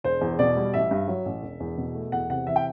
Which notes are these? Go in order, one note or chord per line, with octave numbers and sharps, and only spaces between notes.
E1 C5
E2
B2 D5
G3
A1 E5
G2
F#3
A1
E1
E2
B2
A3
E2 F#5
C3 F#5
E3 E5
G5